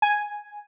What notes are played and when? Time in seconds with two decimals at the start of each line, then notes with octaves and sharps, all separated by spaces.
0.02 G#5